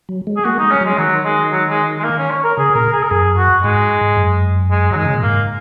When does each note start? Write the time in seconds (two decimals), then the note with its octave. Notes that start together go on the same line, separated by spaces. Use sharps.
0.09 F#3
0.27 G#3
0.37 G#4
0.45 A#3 F#4
0.59 D#4
0.63 G#3
0.71 C#4
0.81 F#3 G#3
0.98 D#3 F#3
1.25 G#3
1.52 F#3
1.69 G#3
1.99 G#3
2.04 A#3
2.18 C#4
2.31 C#5
2.43 A#4
2.57 C#3 G#4
2.74 A#2 A#4
2.92 G#4
3.03 A#4
3.11 F#2 G#4
3.37 F#4
3.63 G#2 G#3
4.17 F#2
4.71 G#3
4.92 F#3
4.96 D#3 G#3
5.05 C#3
5.14 A#2
5.22 G#2 A#3